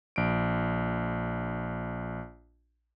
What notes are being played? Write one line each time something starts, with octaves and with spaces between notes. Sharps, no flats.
A#1 D7